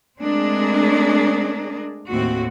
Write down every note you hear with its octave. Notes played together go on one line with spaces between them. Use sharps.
G#3 A3 C4 D4 G#4 A#4
D#2 A2 C4 F#4